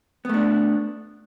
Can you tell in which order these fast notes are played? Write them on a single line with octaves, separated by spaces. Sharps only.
B3 A3 D4